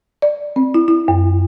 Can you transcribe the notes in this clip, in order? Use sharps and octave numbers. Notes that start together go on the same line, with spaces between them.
D5
C4
E4
E4
F#2